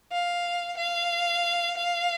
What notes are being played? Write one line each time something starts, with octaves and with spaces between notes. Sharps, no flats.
F5
F5
F5